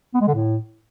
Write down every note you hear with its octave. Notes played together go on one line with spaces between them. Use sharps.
B3
G#3
D3
A2